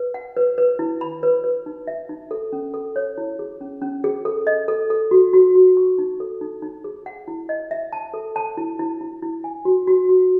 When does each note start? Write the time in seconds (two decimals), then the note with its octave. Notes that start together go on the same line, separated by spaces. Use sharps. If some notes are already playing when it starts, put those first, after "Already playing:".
Already playing: B4
0.14 F#5
0.37 B4
0.58 B4
0.79 E4
1.01 B5
1.23 B4
1.44 B4
1.66 D#4
1.87 E5
2.09 D#4
2.31 A4
2.53 C#4
2.74 A4
2.96 C#5
3.18 E4
3.39 G#4
3.61 C#4
3.82 C#4
4.04 G#4
4.25 A4
4.47 D#5
4.68 A4
4.90 A4
5.11 F#4
5.34 F#4
5.55 F#4
5.77 C#6
5.98 D#4
6.20 A4
6.41 D#4
6.62 D#4
6.84 G#4
7.06 F#5
7.28 E4
7.49 D#5
7.71 E5
7.93 A5
8.14 A4
8.36 A5
8.57 E4
8.79 E4
9.01 E4
9.22 E4
9.44 G#5
9.65 F#4
9.88 F#4
10.09 F#4